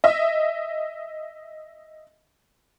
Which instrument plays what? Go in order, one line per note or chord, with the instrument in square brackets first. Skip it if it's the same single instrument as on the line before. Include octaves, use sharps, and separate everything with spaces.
[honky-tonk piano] D#5 E5